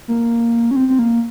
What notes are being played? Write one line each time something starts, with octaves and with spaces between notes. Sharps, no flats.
A#3
C#4
C4
C4
A#3